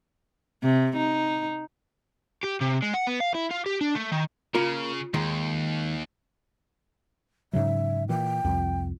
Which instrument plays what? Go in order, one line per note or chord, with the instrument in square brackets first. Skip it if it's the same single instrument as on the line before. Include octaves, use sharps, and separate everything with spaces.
[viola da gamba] C3
D#4
[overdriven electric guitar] G4
C3
G#3
F#5
B3
F5
E4
F4
G4
D4
A3
D#3
[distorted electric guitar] C#3 [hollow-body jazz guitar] A#3 A#4 [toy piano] F4
[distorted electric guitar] D#2 [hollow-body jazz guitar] D#3 G#3
[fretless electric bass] G#2 C#3 F#3 [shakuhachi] E5
[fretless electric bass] A#2 E3 [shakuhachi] G5
[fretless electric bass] C2 F2